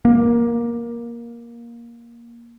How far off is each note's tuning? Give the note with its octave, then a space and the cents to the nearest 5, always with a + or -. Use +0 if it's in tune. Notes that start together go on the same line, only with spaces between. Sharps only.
A#3 +10